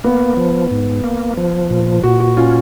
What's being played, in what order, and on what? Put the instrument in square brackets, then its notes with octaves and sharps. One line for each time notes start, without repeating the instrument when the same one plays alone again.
[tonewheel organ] A#3 [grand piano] B3
[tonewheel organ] F3
G#2
A#3
F3
A#2
[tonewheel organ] A#2 [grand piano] F#4
[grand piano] F#4
[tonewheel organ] C#4 [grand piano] F4